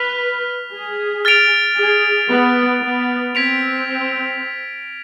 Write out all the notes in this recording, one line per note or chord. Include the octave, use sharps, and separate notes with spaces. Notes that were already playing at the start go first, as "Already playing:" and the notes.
Already playing: B4 F6 B6 F7
G#4
F6 A6 D7 F7
G#4
B3
B3
C4 G#6 B6 D7 F7